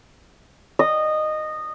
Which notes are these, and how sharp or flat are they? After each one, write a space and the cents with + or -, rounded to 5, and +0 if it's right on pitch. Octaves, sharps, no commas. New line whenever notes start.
D#5 -15